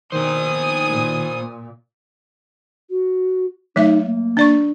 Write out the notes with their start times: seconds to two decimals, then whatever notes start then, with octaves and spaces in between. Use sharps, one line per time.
0.12 B2 D#3 A#3 C5 G#5 D#6
0.90 A#2
2.90 F#4
3.76 F#3 A3 D#4 E5
4.05 A#3
4.37 D4 D5 C#6